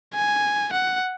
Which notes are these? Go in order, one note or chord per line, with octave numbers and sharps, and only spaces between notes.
G#5
F#5